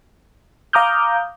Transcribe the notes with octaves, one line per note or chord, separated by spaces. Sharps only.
F5 A#5 D6 D#6 F6 G6